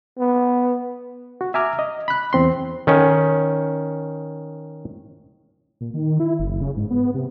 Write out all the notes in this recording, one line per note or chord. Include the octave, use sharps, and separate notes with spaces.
B3
F#4
E5 G#5 A#5 D6 F6
D#5
B5 F#6
E2 C4 C6
D#3 C#4
A#2
D#3
E4
F#1
C#3
G#2
B3
C3